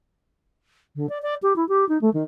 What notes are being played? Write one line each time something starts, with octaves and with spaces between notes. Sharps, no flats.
D3
D5
D5
G4
E4
G4
D#4
A3
D#3